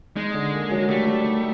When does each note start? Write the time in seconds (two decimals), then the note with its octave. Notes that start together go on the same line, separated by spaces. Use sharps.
0.16 G#3 D#4
0.34 D3
0.53 A#3
0.71 F#3
0.89 G3 A3
1.07 G3
1.26 D#4